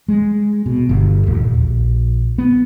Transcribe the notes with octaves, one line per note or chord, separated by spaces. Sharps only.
G#3
B2
G1
D#1
A#1
B3